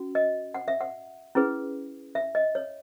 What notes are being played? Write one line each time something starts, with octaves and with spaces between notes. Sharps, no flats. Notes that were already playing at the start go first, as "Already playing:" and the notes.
Already playing: C#4 F#4
D#5
F#5
E5
F#5
C#4 E4 G#4 B4
E5
D#5
C#5